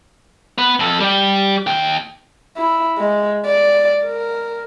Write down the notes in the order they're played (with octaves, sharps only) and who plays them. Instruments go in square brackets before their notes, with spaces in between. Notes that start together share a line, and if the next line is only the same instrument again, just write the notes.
[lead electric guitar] B3 B4
F2 A4
G3 G4
D#2 G5
[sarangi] E4
G#3
D5
A#4